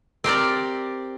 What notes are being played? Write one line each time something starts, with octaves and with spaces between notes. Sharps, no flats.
C4 G4 A#4 D5